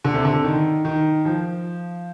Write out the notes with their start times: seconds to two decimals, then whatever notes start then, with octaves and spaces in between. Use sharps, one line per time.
0.04 D3
0.14 C3
0.25 D3
0.44 D#3
0.85 D#3
1.25 F3